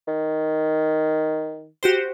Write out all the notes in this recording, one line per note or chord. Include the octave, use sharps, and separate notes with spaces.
D#3
F#4 G4 C5